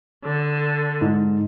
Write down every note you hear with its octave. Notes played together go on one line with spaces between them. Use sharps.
D3
G#2